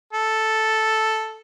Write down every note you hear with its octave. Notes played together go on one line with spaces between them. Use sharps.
A4